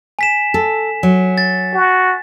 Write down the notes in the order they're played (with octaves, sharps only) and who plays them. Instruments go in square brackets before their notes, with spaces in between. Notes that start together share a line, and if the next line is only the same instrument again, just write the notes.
[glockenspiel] G#5 B6 E7
[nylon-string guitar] A4
F#3
[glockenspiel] A6
[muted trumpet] F#4